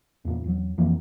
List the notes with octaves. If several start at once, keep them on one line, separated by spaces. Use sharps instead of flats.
E2 A#2
E2 F#3
F2 E3 A#3